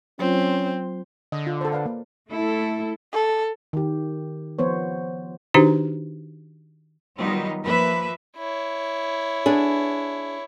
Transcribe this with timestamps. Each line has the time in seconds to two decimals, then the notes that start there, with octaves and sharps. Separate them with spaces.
0.19 F#3 C4 C#4 F4
1.32 D3 D#5
1.47 F4
1.61 A4 C5
1.72 B4 D5 F5
1.86 A#3
2.30 A3 E4 A4
3.13 A4
3.73 D#3 G4
4.59 F3 B3 C5 C#5
5.54 D#3 D4 D#4 F#4 G4 C5
7.18 D#3 F#3 G3 B3 D#4 F4
7.63 F3 A#3 B4 E5
8.37 E4 C#5
9.46 B3 D4 G#4